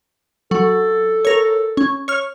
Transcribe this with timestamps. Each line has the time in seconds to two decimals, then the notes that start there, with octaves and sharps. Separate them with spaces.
0.51 F#3 A4
1.25 A#4 C#5
1.77 C#4
2.08 C#5 F6